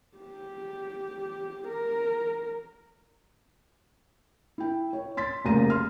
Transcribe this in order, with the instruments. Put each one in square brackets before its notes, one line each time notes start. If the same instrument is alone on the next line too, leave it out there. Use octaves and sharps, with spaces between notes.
[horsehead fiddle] G4
A#4
[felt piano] E4 G5
C#5
C6 A6 B6
F1 C#3 A#3 A#5 A#6 D#7
C6 F6